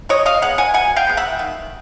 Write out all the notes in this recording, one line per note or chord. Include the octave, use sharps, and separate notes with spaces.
B2 C#5 D#5
D#5 F5
G#3 B3 F#5
F#5 G#5
B2 F#5 G#5
F5 G5
G#3 B3
E5 F#5
D#3